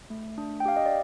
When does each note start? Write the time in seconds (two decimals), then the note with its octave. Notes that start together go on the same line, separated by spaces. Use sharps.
0.10 A3
0.38 D4
0.60 G5
0.65 G4 F5
0.76 D#5
0.86 D5